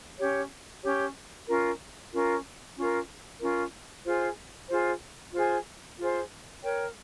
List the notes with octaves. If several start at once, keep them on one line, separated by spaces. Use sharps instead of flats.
C#4 G4 C#5
C#4 G4 C#5
C#4 F4 A#4
C#4 F4 A#4
C#4 F4 A#4
C#4 F4 A#4
F4 G#4 C5
F4 G#4 C5
F4 G#4 C5
F4 G#4 C5
A#4 C#5 G5